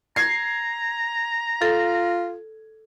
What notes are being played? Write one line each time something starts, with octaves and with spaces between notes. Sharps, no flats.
A#5 G#6 C7
F4 A4